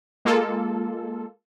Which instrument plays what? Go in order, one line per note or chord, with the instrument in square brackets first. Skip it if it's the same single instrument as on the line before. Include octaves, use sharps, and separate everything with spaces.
[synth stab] G#3 A#3 F4 A4